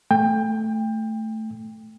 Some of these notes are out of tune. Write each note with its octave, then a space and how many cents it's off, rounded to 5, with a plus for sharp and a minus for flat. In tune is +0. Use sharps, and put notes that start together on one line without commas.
A3 +0 G5 +25